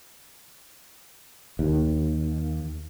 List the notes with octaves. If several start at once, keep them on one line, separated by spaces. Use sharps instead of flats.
D#2